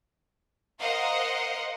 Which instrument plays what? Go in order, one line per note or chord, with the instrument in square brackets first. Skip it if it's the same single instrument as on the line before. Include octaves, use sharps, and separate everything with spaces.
[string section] A#4 C5 D#5 F5 F#5 C6